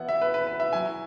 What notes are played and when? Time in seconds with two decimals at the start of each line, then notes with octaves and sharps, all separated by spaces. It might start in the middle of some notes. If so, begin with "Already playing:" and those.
Already playing: E3 B3 E4 F#5
0.09 E5
0.22 B4
0.34 B4
0.47 B4
0.60 E5
0.73 F#3 E4 G#5